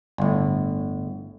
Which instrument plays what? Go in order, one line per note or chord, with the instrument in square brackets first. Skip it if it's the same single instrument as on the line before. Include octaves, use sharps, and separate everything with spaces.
[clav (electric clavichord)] G1 A2